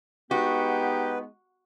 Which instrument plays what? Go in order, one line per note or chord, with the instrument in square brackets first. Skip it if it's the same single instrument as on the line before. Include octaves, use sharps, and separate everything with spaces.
[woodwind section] G#3 B3 D#4 [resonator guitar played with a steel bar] F#4 [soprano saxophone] G4 [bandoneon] B4